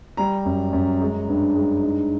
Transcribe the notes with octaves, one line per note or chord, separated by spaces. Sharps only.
G3 A#5
F#2
F#2
G#3
G2
G#3
D#4